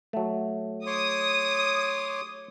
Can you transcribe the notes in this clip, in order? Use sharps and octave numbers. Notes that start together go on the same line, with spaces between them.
F#3 A3
C#5 C6 D6 D#6